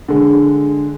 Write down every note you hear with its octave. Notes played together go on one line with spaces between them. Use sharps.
D3 G#3